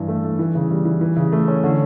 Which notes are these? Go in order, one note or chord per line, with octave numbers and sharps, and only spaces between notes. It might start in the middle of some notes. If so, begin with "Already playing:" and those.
Already playing: G2 E3
A3
A3
E3
C#3
G3
E3
E3
C#3
A3
C#4
D3